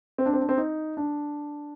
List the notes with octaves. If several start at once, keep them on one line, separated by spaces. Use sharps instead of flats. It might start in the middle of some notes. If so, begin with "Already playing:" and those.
C4
D4
C4
D4
C4
D#4
D4